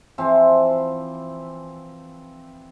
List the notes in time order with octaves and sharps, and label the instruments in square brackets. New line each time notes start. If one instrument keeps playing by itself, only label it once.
[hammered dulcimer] E3 F3 C4